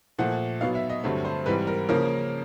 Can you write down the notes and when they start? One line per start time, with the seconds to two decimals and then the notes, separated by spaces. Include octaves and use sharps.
0.18 A#2 F3 A3 F#5
0.61 B2 F#3 B3 D#4 F5
0.75 E5
0.90 D#5
1.03 G2 D3 F#3 A3 C4
1.25 C5
1.46 G#2 E3 G3 C4 B4
1.67 A#4
1.89 C#3 F3 A#3 C#4 A#4